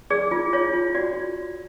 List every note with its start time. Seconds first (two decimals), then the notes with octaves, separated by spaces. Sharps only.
0.10 G#4 D5
0.31 F4
0.53 F4 C#5
0.74 F4
0.95 F#4 D5